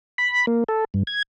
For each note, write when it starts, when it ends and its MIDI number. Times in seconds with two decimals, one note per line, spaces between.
0.18 0.46 83
0.47 0.64 58
0.68 0.84 69
0.94 1.03 43
1.07 1.22 92